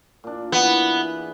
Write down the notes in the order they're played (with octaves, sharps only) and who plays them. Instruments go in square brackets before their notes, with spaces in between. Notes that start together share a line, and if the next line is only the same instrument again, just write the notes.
[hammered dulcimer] A#2 D4
[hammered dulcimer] E3 E4 [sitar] B3
[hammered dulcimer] G#4